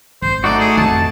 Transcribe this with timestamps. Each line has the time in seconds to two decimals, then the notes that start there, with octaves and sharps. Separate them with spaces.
0.22 G#1 C5
0.44 A3 D#4 F#4 D5
0.60 G#4
0.77 A1 F2 A5